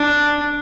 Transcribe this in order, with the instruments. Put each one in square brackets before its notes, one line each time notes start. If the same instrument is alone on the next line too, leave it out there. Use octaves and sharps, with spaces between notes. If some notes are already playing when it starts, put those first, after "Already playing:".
Already playing: [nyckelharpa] D4